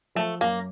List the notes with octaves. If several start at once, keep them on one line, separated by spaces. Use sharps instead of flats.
F3 A3
F#2 A#3